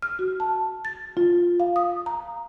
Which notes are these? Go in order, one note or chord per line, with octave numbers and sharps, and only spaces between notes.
F6
F#4
A5
A6
F4
F5
D#6
A#5